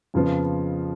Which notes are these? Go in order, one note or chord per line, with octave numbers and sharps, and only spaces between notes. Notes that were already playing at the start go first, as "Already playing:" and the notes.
F2 C#3 F3 B3